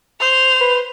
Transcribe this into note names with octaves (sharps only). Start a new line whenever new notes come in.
C5 F7
B4